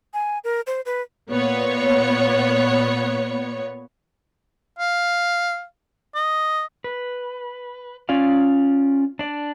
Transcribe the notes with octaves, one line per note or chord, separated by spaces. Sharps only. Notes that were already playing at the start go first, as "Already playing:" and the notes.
G#5
A#4
C5
B4
A#2 B3 C#5
F5
D#5
B4
C#4 F4 D5 F5
D4 D5